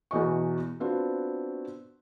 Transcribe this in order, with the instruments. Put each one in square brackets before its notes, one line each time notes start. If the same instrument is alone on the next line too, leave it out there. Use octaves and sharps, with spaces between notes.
[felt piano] E2 B2 E3 D#5 C#6
B3 C4 D4 F4 F#4